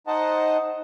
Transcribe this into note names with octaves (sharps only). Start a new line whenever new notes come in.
D#4 C5 D#5 F#5 A5